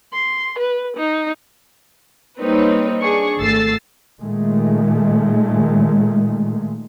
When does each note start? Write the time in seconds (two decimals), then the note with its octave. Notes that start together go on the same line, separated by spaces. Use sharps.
0.14 C6
0.59 B4
0.97 D#4
2.40 G3 A#3 C4 D#4 B4 C#5
3.02 D4 G#4 C#6
3.38 G#1 A3 E6 A6 C7
4.22 A#2 D#3 G#3 A3